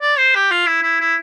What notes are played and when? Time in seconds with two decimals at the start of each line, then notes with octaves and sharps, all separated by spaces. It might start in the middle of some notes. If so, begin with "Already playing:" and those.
0.02 D5
0.18 C5
0.35 G4
0.51 F4
0.67 E4
0.83 E4
1.00 E4